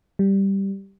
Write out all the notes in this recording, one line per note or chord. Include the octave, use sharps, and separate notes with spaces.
G3